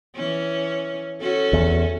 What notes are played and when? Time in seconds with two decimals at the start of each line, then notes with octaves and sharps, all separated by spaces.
0.15 E3 C#4
1.20 C#4 F#4 A4
1.53 E2